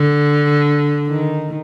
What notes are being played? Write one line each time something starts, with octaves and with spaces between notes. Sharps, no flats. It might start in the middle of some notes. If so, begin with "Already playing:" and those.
Already playing: D3
D#3